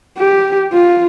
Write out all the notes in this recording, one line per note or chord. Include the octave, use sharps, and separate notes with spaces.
G4
F4